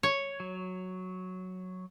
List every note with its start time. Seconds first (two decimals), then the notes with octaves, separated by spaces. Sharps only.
0.03 C#5
0.40 F#3